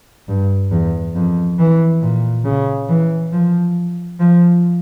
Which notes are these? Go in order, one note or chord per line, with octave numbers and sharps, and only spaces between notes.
G2
E2
F2
E3
A#2
C#3
E3
F3
F3